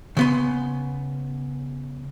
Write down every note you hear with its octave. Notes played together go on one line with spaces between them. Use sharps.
C#3 B3 C6